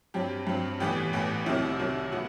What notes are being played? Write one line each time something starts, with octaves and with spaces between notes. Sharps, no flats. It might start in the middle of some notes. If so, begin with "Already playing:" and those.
G2 F#3 C4 G4
G2 F#3 C4
A1 A2 E3 B3 G4
A1 A2 E3 B3
C2 C3 D#3 F#3 E4
C2 C3 D#3 F#3
A2 F#3 B3 F#4